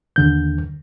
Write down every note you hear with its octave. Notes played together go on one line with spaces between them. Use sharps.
D#2 D3 G6